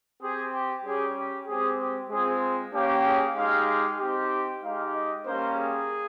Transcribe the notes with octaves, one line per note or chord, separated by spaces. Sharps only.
C4 G4 G#4
G4
G3 C#4 G4 G#4
G4
G#3 C4 G4 G#4
G4
G#3 C4 F4 G#4
A#3 C#4 G4
G#4
G#3 D#4 G4 F5
F5
C4 D#4 G4
G#3 D#4 G4 F5
D#5
G3 A#3 C#4 G4 C5
G#4